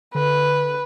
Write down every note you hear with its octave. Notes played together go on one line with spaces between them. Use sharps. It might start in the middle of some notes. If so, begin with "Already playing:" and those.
D3 B4